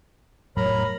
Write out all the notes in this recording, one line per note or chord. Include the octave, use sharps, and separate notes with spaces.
F1 A2 F#3 A#4 C#5 A#5 B5